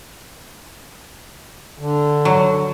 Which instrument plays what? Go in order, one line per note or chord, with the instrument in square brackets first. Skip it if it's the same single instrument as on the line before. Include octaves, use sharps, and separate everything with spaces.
[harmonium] D3
[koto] F#3